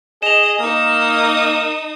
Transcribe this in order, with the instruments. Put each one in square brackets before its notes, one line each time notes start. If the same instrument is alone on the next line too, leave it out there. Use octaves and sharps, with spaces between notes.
[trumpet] G#4 [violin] D#5 [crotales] E7 F7
[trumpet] A#3 [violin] D#4 D#6